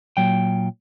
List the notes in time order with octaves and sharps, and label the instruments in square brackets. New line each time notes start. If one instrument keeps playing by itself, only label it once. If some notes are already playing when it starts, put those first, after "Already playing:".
[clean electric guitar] A#2 F#3 G5